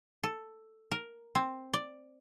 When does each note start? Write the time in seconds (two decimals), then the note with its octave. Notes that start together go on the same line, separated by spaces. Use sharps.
0.23 A4
0.91 A#4
1.35 C4
1.74 D5